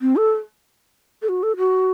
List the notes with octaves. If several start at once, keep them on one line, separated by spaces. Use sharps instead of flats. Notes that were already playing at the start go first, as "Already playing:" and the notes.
C4
A4
A4
F#4
A4
F#4